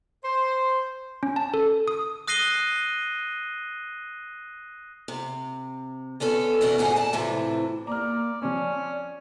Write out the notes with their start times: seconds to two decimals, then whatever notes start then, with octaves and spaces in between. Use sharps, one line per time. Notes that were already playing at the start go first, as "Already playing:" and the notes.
0.23 C5
1.23 C#4
1.36 A5
1.54 A4
1.88 D#6
2.28 D#6 F#6 A#6 C7 D#7 G7
5.08 C3
6.20 D3 B3 C#4 A4
6.61 E2 B2 B3 C#4 D4 A#4
6.78 D#2 G#2 G#4 F#5
6.96 A#2 A5
7.13 A2 C3 E3 F3
7.87 A#3 D5 A#5 F6
8.42 F3 C4 C#4 D5